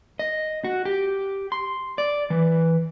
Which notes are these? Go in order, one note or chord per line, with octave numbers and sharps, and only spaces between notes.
D#5
F#4
G4
C6
D5
E3